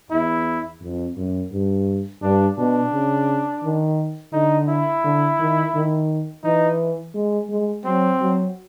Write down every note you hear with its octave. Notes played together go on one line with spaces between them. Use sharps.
E2 E4
F2
F#2
G2
G2 D4
B2 D4
C#3
D#3
D3 D#4
E4
D3
D#3
D#3
E3 D#4
G#3
G#3
F#3 C4
F#3